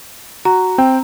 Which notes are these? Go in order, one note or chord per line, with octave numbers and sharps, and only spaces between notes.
F#4 A#5
C4 G5